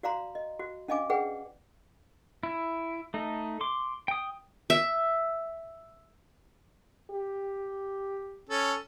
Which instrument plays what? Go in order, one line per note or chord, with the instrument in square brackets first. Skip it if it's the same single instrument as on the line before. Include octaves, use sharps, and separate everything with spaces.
[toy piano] F#4 D5 F5 A#5 C6
D#5
F#4
C#4 D4 D#5 F5 G#5 D6
G#4 B4 D5 F#5 G5
[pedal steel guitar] E4
A3 D#4
C6 D6
G5 D#6
[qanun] E5
[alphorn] G4
[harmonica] C#4 A4